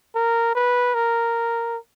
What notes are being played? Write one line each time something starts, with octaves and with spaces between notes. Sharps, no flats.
A#4
B4
A#4